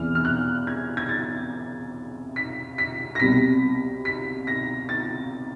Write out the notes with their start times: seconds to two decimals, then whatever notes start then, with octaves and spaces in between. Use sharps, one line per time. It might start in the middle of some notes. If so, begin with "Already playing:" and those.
Already playing: E2 C3 E3 F6
0.15 F6
0.25 F#6
0.67 G#6
0.97 G#6
1.09 A6
2.36 B6
2.78 B6
3.15 A#6
3.20 C2 B2 G3 B6
4.05 B6
4.47 A#6
4.89 A6